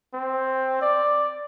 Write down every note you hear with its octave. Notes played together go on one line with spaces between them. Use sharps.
C4
D5